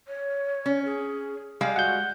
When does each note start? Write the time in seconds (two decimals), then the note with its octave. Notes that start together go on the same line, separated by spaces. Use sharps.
0.08 C#5
0.66 C#4
0.85 G#4
1.61 G3 G#3 D5 F5
1.76 F#4 F#5 G6